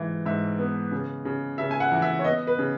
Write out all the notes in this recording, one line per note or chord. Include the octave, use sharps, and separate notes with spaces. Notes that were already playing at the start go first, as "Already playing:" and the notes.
Already playing: G#2 E3
G#2 E5
B3
C#3
C#3
C#3 E5
G#5
F#5
E3
E5
C#5
B3 D#5
B4
C#3